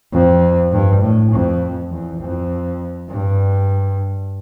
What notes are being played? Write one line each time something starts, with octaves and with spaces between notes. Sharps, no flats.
F2
G2
A2
F2
E2
F2
G2